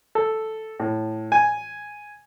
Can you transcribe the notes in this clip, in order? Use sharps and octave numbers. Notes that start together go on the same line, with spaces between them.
A4
A2
G#5